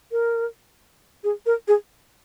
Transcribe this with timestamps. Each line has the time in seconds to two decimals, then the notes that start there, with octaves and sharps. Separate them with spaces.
0.12 A#4
1.24 G#4
1.46 A#4
1.68 G#4